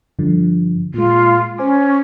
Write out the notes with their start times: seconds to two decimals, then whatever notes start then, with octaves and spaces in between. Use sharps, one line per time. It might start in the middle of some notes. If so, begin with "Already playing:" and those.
0.19 G2 D3 F3
0.94 A#2 G#3 F4
1.58 C#4 C5 G#5 D6